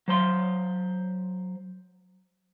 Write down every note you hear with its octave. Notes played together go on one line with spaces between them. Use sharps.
F#3 C5 C6